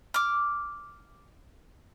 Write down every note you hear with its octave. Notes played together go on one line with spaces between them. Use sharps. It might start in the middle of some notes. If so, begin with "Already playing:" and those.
D6 F6